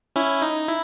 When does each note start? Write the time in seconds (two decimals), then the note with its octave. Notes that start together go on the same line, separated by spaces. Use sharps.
0.16 C#4 E4
0.42 D#4
0.68 E4